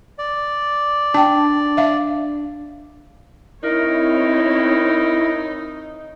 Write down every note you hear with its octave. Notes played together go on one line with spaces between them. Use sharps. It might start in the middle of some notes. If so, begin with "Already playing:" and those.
D5
D4 G5 A5
E5 F5
C4 D#4 E4 A#4 C#5